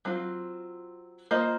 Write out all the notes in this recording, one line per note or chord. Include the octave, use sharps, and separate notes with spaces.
F#3 C4 F4
A#3 F4 C5 D#5